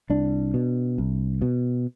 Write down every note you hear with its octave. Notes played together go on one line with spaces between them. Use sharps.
C2 D4
B2
C2
B2